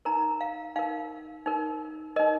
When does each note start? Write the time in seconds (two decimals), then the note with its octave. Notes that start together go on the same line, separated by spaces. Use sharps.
0.05 D#4 A#4 A#5
0.41 F5
0.76 D#4 A#4 F5
1.46 D#4 A#4
2.16 D#4 A#4 D#5